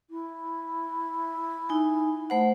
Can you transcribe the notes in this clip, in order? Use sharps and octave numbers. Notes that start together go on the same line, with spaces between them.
E4
D#4 G#5
A3 C5 F#5